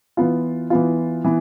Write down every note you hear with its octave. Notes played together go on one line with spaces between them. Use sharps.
E3 B3 F4
E3 B3 F4
E3 B3